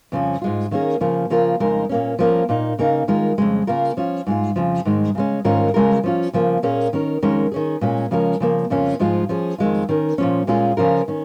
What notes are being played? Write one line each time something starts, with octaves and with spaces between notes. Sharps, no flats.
F2 C#3 F3 C#4
G#2 G#3 F4
D#3 A#3 C#4 G#4
C#3 F3 A#3
C#3 F3 A#3 F4 A#4
F2 C#3 G#3 D#4 A#4
A#2 A#3 C#4
F3 A#3 C#4 A#4
A#2 A#3 D#4
C#3 A#3 D#4
D#3 G#3 F4 A#4
F2 C#3 G#3
C#3 A#3 F4 A#4
F3 C#4 F4
G#2 G#3 F4
F2 C#3 F3
G#2 D#3 G#3
C#3 G#3 C#4
G#2 D#3 C#4 F4 A#4
C#3 G#3 F4 A#4
F3 C#4 F4
C#3 F3 A#3
A#2 A#3 C#4 G#4
D#3 C#4 A#4
F2 D#3 G#3 C#4 A#4
D#3 C#4 G#4
A#2 G#3 C#4
C#3 F3 G#3 C#4 A#4
C#3 F3 A#3
F2 C#3 A#3 C#4 F4
G#2 F3 G#3 F4
F3 C#4 G#4
F2 D#3 G#3 F4
D#3 C#4 A#4
A#2 F3 C#4
A#2 G#3 C#4 F4 G#4
C#3 F3 C#4 F4 A#4
D#3 C#4